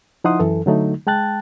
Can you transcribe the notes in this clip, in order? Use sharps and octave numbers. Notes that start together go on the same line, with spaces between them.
F3 D#4 E4 F#5 C6 D#6
F#2 E3 A4
D3 F#3 A3 D#4
G#3 G5 A5 F#6 A6